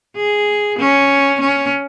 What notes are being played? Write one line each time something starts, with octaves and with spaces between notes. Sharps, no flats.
G#4
C#4
C#4